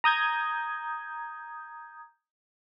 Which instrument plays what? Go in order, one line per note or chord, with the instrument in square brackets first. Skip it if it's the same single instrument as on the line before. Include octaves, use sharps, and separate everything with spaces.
[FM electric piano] A#5 D#6 G6 G#6